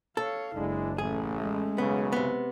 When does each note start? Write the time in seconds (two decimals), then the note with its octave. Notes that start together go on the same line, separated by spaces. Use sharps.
0.17 A4 C#5 F5
0.55 F#1 G#3 D4 E4
0.98 A1 A3 C#4 G#4
1.41 G#3
1.78 B1 F#2 C#3 B3
2.13 C3 B3